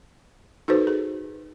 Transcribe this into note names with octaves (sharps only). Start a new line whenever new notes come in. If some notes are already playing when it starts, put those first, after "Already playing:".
D#4 F#4 A4 B4 C5
G#4